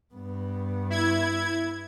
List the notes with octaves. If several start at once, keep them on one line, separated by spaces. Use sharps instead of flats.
G2 B3
E4 G#6